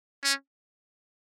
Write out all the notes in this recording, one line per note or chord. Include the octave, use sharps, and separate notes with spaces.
C#4